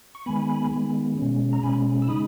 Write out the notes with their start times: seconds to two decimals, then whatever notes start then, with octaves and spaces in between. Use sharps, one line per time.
0.15 C#6
0.26 D#3 G#3 B3 G#5 B5
0.71 D#3 G#3 B3
1.18 B2 G#3 C#4
1.53 A#5
1.62 B2 G#3 C#4 G#5 B5
2.02 E6
2.08 C#3 G#3 D#4 B5 D#6